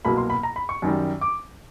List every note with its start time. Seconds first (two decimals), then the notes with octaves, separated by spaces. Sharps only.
0.05 C2 B2 F#3 A#3 B5
0.17 C6
0.30 B5
0.43 A#5
0.56 B5
0.69 C#6
0.82 F#2 D#3 G3
1.21 D6